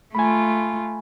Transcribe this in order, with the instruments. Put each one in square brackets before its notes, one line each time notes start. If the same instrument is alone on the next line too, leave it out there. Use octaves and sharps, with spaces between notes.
[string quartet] A3 F4 [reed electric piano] G#5 B5